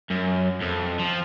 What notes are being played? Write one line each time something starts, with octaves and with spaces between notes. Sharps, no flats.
F#2
F2
F3